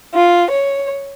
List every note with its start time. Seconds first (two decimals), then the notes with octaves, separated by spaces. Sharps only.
0.15 F4
0.50 C#5